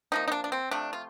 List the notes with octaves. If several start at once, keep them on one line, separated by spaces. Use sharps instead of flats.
C3 F3 A#3 D#4
D#4
D4
D4
C4
C3 F3 A3 D4
F4